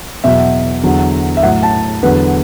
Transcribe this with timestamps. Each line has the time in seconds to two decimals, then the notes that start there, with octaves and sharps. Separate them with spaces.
0.24 E2 B2 F#3 E5
0.83 E2 D3 F#3
1.37 E5
1.43 A2 F#3 F#5
1.63 A5
2.03 E2 D3 F#3 B4